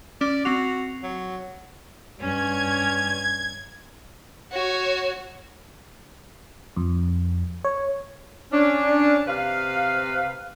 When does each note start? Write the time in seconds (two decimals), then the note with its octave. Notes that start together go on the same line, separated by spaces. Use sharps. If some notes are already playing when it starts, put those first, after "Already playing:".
0.21 C#4 D5
0.45 C4 F#4 C7 F7
1.03 F#3
2.20 G2 C#4 G#6
4.52 F#4 C#5
6.76 F2
7.64 C#5
8.52 C#4 D4
9.27 C3 B4 F5